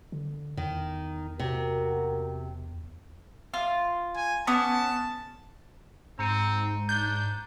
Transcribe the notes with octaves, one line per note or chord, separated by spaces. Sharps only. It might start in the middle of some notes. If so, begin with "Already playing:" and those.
D3
E2 D#3
C3 F#4 A#4
F4
G#5
B3 C#4 A5 D#6
G#2 C4 A#5 C#7 D#7
D4 G6